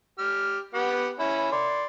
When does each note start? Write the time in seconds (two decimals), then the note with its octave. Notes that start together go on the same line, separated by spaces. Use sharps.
0.18 G4 F6
0.74 B3 G4 F#5
1.20 C#4 E4 B5
1.52 D5 C6